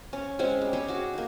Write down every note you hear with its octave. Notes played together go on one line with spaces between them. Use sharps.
C#4
G#3 C4 C#4 C5
G3
C4 C#4 G4 G#4
F#4 D6
A#3 D#4